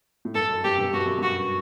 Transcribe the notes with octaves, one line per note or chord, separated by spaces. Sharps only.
A2
G2 A4
F#2
G2 G4
G2 B2
G2 F#4
F#2
G2 F#4